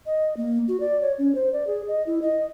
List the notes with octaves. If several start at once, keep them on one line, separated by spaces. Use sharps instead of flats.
D#5
A#3
F#4
D5
C#5
C#4
C5
D5
G#4
D#5
E4
D#5